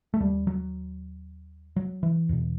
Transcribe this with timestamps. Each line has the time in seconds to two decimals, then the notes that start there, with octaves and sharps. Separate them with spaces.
0.14 A3
0.20 D#2 G3
0.47 F#3
1.76 F#3
2.03 E3
2.29 E2 B2